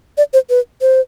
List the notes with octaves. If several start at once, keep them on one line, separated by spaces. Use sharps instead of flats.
D5
C5
B4
C5